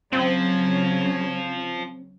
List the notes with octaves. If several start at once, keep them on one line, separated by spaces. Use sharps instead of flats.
C#3 F3 F#3 C4 C#4